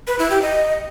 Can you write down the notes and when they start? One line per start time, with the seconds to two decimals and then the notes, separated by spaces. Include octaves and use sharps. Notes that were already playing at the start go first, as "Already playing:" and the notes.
0.07 B4
0.19 E4
0.30 G4
0.42 D#5